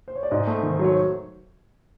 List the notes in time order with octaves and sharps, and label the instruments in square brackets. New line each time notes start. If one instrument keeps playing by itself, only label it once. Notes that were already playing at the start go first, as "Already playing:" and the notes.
[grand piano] C5
C#5
D5
G#2 D#5
A3
D#3
C5
F#3 C#5